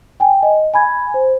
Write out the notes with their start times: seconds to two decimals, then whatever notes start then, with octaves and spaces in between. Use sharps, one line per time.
0.20 G5 G#5
0.43 D#5
0.74 G#5 B5 G#6
1.14 C5